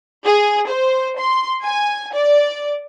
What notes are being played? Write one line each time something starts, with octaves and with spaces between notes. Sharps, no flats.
G#4
C5
C6
G#5
D5